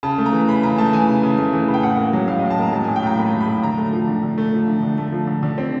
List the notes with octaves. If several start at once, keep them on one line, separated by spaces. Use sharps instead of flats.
C#3 A5
A3
A#5
E3
C#3 B5
C#3 A#5
A3 A5
E3 G#5
C#3
C#3
A3
E3
C#3
G5
A2 F#5
A#3
F#3
A2 F5
D#5
A2
A5
A#3 A#5
F#3 A5
G#5
A2
G5
A2 A#5
A#3 B5
F#3
B5
A2
D3 A#5
A3
F3
D3
D3
A3
F3
D3
D3
A3
F3
D3
D3
C4